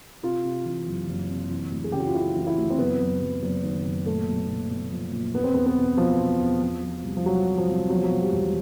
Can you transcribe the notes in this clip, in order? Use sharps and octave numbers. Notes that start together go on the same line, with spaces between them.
C3 F4
C3
E3
F#1
F#1
C3
E3
D2
G#4
C#3 G4
F#4
F4
C#3 E4
E3
E4
D2
C4
F#1 B3
F#1
F#1
F#1
D#3
F#1
A#2 A3
B1
A#2
B1
F3
A#2
E2 B3
C4
E2 B3
B3
B2
B2 F3
B2
E2
F3
F3
C2
F3
C2 F#3
F3
F3
C2
E2 F#3
F3
F#3
B2
G3
E1